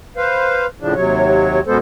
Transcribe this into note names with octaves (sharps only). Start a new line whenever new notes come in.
B4 C5 F5
A2 C#3 F3 D4
D#2 C3 F#3 C#5
F#2 B2 G#3 B3 A4 C5